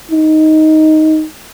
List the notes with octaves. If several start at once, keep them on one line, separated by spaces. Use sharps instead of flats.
D#4